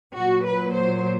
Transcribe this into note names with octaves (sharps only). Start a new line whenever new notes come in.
A#2 F#3 F#4
B4
C5